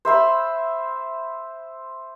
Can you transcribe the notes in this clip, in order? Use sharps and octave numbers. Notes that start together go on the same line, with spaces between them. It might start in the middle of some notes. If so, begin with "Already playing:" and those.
C5 E5 B5 C6